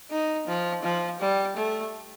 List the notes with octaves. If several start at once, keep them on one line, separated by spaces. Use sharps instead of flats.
D#4
F3
F3
G3
A3